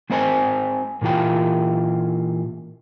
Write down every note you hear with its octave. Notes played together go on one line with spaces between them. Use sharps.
G#3 C4 D4 C5 D#5 G#5
A#2 E3 F4 G5